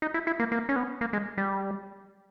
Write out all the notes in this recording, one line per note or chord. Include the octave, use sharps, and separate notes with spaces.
D#4
E4
E4
A#3
A#3
C#4
B3
A#3
G#3
G3